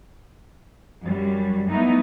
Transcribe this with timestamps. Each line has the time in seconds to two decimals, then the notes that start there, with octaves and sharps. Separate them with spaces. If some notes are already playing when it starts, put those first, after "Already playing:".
1.04 F#2 F#3 G3
1.69 A3 B3 D#4 E4